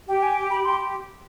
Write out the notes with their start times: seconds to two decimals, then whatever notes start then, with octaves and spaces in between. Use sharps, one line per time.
0.08 G4 G5
0.23 G#5
0.50 B5
0.65 G4 C6